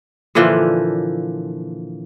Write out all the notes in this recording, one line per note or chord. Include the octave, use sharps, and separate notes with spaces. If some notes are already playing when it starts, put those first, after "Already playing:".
A#2 D3 E3 F3